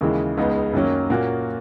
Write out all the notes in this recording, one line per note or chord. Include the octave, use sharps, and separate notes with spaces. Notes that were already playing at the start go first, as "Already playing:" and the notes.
D#2 C#3 E3 G#3
C#2 C#3 G#3 B3 D#4
F#2 D#3 F#3 A#3 C#4
A#2 A#3 C#4 F#4